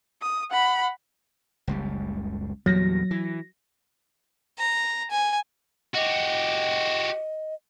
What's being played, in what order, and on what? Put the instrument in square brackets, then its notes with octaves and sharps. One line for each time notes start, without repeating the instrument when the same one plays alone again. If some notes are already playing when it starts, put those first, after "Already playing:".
[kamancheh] D#6
F#5 B5
[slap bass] F#1 C#2 G3
[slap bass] E2 A#2 G3 [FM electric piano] F#3 A#6
[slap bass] E3
[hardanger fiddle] A#5
G#5
[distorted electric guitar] F#4 G4 [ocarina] D#5